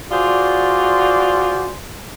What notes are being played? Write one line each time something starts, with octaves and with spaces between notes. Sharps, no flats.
F4 F#4 G#4 C5 D5